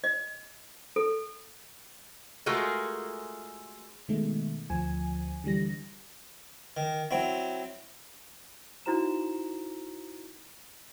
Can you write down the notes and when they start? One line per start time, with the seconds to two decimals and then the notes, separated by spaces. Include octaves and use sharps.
0.04 D#5
0.96 A4
2.46 G#3 A3 F4 F#4 G#4 A#4
4.08 B2 D#3 G#3 A3
4.70 D2 F3 G#5
5.44 D3 E3 G3 A#6
6.77 D#3
7.11 F#3 C4 E4
8.86 D#4 E4 F#4 C5 A#5 E7